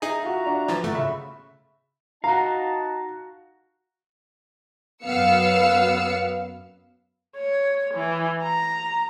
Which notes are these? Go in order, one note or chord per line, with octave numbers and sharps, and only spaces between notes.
D#4 G#4 E5 A#5
F4 F#4
D4 F#4
E3 F3 A6
G1 A3 B3 F4 F#4
C#3 E5 B5
D#4 F#4 F5 A5 A#5
F#2 B3 F5 E6 C#7
C#5
E3
A#5